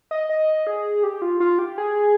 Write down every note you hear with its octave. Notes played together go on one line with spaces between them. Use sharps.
D#5
D#5
G#4
G4
F4
F4
G4
G#4